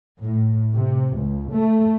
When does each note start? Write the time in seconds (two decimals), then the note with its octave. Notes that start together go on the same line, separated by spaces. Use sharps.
0.22 A2
0.75 C3
1.19 C#2
1.54 A3